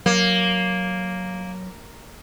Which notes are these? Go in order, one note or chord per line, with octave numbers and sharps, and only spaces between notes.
F#3 A#3